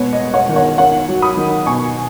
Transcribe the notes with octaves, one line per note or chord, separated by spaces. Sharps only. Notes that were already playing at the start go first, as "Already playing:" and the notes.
Already playing: B2 G#3 B3 C#5
D#5
B3
C#5 F#5
D#3
C#5 F#5
D#3 C#5 F#5
F#3
B5 D#6
D#3
B2 G#5 C#6